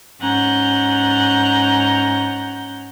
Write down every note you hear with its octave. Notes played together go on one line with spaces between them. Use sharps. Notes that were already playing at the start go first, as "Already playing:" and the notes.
G#2 C#4 F#5 A#5 G6